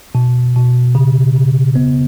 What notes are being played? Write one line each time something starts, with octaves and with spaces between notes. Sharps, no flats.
B2
B2
C#3
C#3
B3